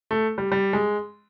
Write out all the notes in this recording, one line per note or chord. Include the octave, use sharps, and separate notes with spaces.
A3
G3
G3
G#3